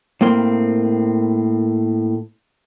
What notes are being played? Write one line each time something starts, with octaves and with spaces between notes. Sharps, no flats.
A2 A#3 C4 A#4 C6